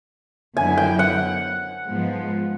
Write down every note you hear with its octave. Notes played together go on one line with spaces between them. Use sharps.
F#2 D3 F#3 B3 E4 G#5
G5
F#5
G#2 F3 G#3 B3